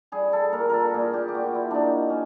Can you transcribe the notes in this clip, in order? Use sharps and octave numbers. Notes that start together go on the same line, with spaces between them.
G3 G#4
A4
A#2 A#4
A4 A#4
A#2 G#4
G4
G4
A#2 F#4
E4
A#2 D4 D#4
C#4